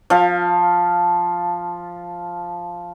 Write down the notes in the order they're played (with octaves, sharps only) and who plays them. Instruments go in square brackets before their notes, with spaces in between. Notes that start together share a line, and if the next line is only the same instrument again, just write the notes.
[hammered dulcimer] F3 F5